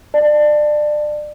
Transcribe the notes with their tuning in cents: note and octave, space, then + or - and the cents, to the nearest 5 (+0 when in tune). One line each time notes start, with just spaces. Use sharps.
D5 +25 A5 +0